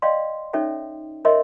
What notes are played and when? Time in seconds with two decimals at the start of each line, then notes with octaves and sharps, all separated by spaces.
0.02 D5 D#5 F5 G5 C6
0.53 C#4 D#4 A4 C#5 E5 G5
1.25 A#4 C#5 D#5 E5 C6